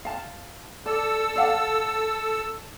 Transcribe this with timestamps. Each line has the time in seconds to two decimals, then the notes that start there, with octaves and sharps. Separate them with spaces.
0.05 F5 A5
0.86 A4 D5 E6
1.36 D5 F5 F#5